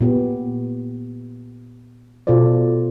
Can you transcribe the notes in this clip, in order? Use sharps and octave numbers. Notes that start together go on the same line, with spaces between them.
A#2 B3 G4
B2 F4 A4 C5 D5